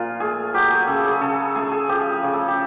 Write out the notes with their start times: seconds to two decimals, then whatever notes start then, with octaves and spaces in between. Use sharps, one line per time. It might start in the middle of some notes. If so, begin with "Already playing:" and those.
Already playing: A#2 F3 F4
0.20 A3 G#4
0.54 F#3 G4
0.70 G#4
0.87 C#3 A4
1.05 G#4
1.21 C#3 A4
1.55 A3 G#4
1.63 A4
1.71 G#4
1.88 F3 G4
2.11 G#4
2.23 C#3
2.33 A4
2.48 G4